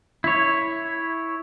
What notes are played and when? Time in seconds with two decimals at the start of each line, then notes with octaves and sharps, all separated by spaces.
0.24 E4 C#5